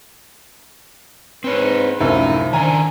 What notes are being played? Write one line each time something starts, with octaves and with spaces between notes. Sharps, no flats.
G#2 C4 B4 C#5
C2 F#2 A2 F3 D#4
D#3 D4 G#5 A#5